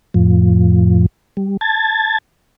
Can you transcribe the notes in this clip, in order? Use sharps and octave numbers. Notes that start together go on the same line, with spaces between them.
F2 A2 F3
G3
A5 G#6 A6